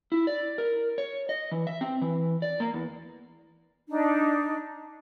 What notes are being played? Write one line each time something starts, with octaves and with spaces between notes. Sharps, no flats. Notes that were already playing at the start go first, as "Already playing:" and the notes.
E4
D5
A#4
C#5
D#5
E3
E5
C4
E3
D5
A#3
E2
D4 D#4